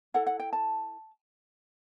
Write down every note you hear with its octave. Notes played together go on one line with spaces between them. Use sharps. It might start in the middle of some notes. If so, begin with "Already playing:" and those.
E4 A4 F#5
F#5
G5
A5